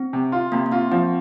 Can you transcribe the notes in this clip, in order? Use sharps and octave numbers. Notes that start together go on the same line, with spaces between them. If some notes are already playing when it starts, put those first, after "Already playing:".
Already playing: C4
C3
F4
C3 A#3
A#3
C4 F4
F3 C4